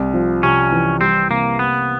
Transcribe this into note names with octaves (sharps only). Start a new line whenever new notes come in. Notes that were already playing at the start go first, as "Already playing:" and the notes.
Already playing: C2
F3
C3 C#4
E3
G3 C4
C3 A#3
A#3 B3